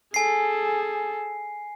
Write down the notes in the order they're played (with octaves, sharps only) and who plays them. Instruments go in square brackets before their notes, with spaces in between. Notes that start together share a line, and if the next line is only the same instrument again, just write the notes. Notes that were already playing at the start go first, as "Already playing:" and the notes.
[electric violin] G#4 A4 [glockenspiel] G#5 C7